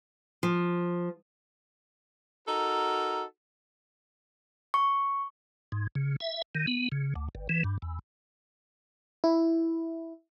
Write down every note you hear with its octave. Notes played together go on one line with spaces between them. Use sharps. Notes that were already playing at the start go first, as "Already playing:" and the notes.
F3
D#4 F#4 A4 A#4
C#6
G#2
C#3
E5
D#3
B3
C#3
D2
G1
E3
G2
E2
E4